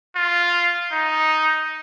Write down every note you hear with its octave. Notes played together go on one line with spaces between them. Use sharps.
F4
D#4